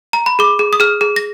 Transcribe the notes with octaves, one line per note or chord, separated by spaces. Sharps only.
A#5
B5
G#4 D6
G#4
D#6
G#4 F6
G#4
A#6